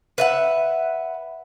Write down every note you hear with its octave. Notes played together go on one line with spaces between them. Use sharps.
B4 E5 F#5